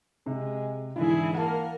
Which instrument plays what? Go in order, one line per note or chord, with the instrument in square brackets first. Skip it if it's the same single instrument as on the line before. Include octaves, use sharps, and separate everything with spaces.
[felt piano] C3 [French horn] G#3
[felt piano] G#2 D3 [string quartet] E3 G#4 [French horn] E4
[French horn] A#3 [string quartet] A#4 [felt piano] F#5 A5